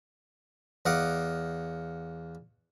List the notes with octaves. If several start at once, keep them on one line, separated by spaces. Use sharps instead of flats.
E2 D#5 F5 F#5 D6